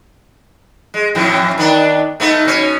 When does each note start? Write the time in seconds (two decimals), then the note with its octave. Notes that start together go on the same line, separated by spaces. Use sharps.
0.94 G#3
1.15 F2 A2 E3
1.58 D#3 B3 D4
2.20 A3 B3 D#4
2.45 B2 C#4